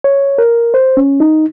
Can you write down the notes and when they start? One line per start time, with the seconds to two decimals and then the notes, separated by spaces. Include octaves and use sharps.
0.04 C#5
0.38 A#4
0.74 C5
0.97 C#4
1.20 D#4